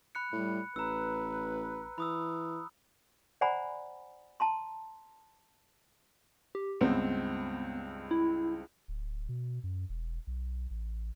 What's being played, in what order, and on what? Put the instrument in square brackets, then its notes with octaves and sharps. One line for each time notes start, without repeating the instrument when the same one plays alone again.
[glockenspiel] B5 F#6 C#7
[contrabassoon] A2 [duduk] G3
[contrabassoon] A1 [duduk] B4 [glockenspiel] A#5 E6
[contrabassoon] E3 [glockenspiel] B5 D#6 E6
[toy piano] C5 D5 F#5 G#5 A#5 B5
A5 A#5 C6
[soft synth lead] G4
[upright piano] C#2 G2 C4 [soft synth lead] B3
[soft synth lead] E4
[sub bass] D1
B2
F#2
E1
B1
A1